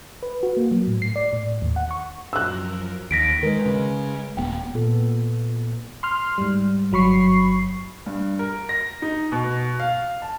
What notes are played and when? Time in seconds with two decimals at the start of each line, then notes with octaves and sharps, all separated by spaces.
0.23 B4
0.43 F#4
0.57 A#3
0.72 F#3
0.87 A2
1.02 C7
1.16 D5
1.33 A2
1.62 D#2
1.76 F#5
1.91 C#6
2.33 F#2 F3 A#4 E6 F#6
3.11 D#2 A#6 B6 D7
3.43 D#3 G#3 A#4 B4
3.66 C#3
4.37 D#1 B3 G5
4.74 A#2 B3 A4
6.03 C6 F6
6.38 G#2 G3
6.92 G1 F#3 B5 C#6 C7
8.06 G2
8.39 A#4
8.69 A#6
9.02 D#4
9.32 B2
9.80 F5
10.22 A5